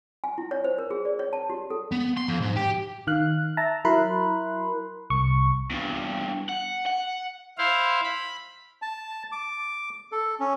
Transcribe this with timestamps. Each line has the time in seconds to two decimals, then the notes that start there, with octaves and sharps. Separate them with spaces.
0.24 G#5
0.38 E4
0.51 C#5
0.64 C5
0.79 A#4
0.91 G#4
1.05 D5
1.19 C#5
1.33 A5
1.50 G4
1.70 A4
1.91 B3
2.17 C6
2.28 F2
2.41 G#2
2.56 G4
3.07 D#3 F5 F#6
3.57 E5 A5 A#5
3.85 F#3 E4 A#4 B5 C6 F#6
5.10 C2 C#6
5.70 E2 G2
6.49 F#5
6.86 F#5
7.58 E4 C5 F5
8.04 B5
8.82 A5
9.32 D6
10.12 A4
10.40 C#4